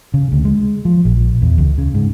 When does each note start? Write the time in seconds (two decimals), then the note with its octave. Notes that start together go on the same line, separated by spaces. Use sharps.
0.14 C#3
0.32 D2
0.45 G#3
0.85 F3
1.05 A#1
1.42 E2
1.58 C#2
1.78 C#3
1.94 G#2